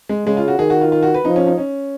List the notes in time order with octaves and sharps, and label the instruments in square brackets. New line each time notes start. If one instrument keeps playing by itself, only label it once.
[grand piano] G#3
[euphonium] C#3 [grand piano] G#3
[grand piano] F4
F#4
[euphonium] D#3 [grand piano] G#4
[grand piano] F#4
F4
F4
F#4
B4
[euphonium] F3 [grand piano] D#4
[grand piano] C#4
D#4
C#4